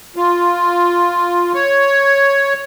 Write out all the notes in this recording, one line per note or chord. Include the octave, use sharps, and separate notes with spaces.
F4
C#5